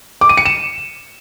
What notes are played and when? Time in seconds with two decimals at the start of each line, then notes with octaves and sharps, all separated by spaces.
0.21 D6
0.29 D#7
0.37 C#7
0.46 E7